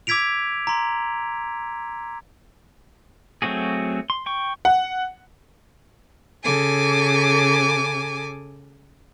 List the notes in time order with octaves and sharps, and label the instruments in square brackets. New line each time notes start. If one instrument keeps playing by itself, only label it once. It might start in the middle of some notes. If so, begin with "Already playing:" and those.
[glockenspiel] D6 E6 G#6 B6 D7 F7
A#5 C6
[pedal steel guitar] F#3 A3 C4 F#4 G#4
C6
G5 C#6
[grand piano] F#5
[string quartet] C#3 A4 G#5 D6